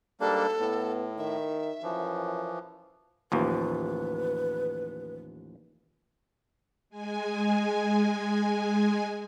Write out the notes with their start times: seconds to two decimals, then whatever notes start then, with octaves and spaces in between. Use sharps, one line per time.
0.21 G#2 G3 A#3 D4 A4
0.60 A2 B3
1.18 D#3 E5
1.83 F#2 E3 F3
3.32 A1 D#2 F3 B4
6.90 G#3 G#5